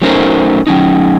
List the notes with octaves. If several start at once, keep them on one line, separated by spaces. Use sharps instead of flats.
F#3 A3 C#4 D#4 A#4 C5
F#3 C#4 D#4